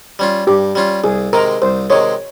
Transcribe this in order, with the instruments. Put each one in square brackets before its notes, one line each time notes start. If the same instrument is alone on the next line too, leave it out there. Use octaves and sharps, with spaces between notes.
[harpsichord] G3 C#4 F4
[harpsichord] G2 [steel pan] G4
[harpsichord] G3 C#4 F4
[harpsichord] C2 [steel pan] G#4
[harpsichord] C3 D#3 G#3 [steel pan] A#4
[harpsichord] C2 [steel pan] C5
[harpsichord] C3 D#3 G#3 [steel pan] C#5